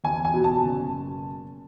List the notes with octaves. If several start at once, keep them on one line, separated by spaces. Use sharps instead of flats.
E2 G#5
G#5
B2
A5
F#1